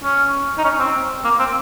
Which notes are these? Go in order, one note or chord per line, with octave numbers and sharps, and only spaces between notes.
C#4
D#4
C#4
C4
A#3
C4